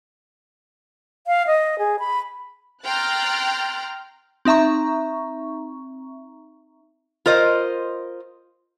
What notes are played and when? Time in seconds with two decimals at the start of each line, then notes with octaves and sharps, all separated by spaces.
1.27 F5
1.47 D#5
1.79 G#4
1.99 B5
2.84 G5 A#5 C6 F6 F#6 A6
4.45 C4 D#4 E5 A#5 C#6
7.26 F4 A#4 C5 D#5